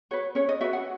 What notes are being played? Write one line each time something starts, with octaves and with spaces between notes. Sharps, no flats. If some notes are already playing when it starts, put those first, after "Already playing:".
F#4 B4 C#5
C#4 C#5
D#5
F#4 B4 E5
F#5